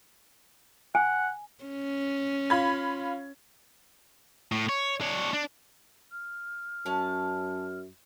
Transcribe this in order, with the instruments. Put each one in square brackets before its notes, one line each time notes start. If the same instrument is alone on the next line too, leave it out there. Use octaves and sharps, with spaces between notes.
[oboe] F#5 [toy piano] G#5
[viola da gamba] C#4
[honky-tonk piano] F4 B5 G#6
[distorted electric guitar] A2
C#5
D4 C#5
D4
[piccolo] F6
[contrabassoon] F#2 [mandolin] C#4 A5